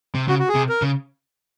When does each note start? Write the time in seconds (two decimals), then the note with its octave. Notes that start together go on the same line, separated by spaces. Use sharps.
0.15 C3
0.28 C#3 F#4
0.39 F#4
0.49 G#4
0.55 C3
0.69 A#4
0.82 C#3